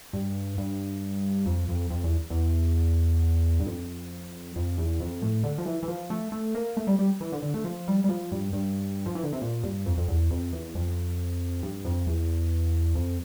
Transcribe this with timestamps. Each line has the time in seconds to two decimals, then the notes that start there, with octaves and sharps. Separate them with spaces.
0.13 G2
0.58 G2
1.46 F2
1.68 F2
1.90 F2
2.04 E2
2.30 E2
3.60 G2
3.67 F2
4.56 F2
4.78 E2
5.00 F2
5.22 A2
5.44 D3
5.58 F3
5.66 E3
5.83 E3
5.88 F3
6.10 A3
6.32 A3
6.55 A#3
6.77 A3
6.87 G3
6.99 G3
7.21 E3
7.32 D3
7.43 D3
7.54 A3
7.64 F3
7.88 G3
8.04 G3
8.09 F3
8.32 G2
8.53 G2
9.06 F3
9.15 E3
9.24 D3
9.32 C3
9.42 A#2
9.64 G2
9.86 F2
9.98 F2
10.08 E2
10.30 F2
10.53 E2
10.75 F2
11.63 G2
11.85 F2
12.07 E2
12.95 F2